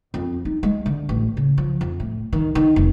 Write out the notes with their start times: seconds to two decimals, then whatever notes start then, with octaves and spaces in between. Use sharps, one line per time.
0.14 F2
0.45 D#4
0.63 G#3
0.86 D3
1.09 A1
1.37 C#3
1.58 F3
1.81 F2
2.00 A2
2.33 D#3
2.55 D#3
2.76 F1